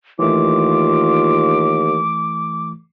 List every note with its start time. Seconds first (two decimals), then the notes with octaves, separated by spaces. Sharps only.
0.19 D#2 E3 A3 F4 D6